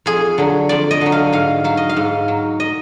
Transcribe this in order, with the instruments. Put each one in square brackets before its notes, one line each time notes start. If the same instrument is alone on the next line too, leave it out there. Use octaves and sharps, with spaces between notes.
[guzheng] F2 G#4
D3 F#3
F2 D5
D#5
D3 F#3
F5
G#2 F5
F#3 F5
D#5
F5
G#2
F#3
D#5